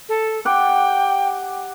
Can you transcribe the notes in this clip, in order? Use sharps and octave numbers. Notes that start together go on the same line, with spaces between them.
A4
G4 F#5 G5 D6